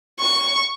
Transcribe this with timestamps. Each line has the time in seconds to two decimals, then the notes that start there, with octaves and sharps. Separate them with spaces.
0.20 C#6